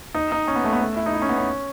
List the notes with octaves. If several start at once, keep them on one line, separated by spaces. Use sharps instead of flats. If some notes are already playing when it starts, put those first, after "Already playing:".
D#4
D#4
C#4
B3
A3
B3
A3
E4
D#4
E4
C#4
B3
C#4